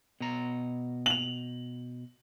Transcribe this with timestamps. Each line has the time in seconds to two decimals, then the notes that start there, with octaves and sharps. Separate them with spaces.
0.20 B2 A#5
1.06 F7 F#7